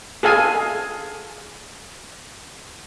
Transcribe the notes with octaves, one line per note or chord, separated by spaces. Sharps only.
G#4 A4 F5 G#5